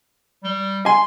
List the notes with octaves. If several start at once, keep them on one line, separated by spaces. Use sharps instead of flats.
G3
G#5 C6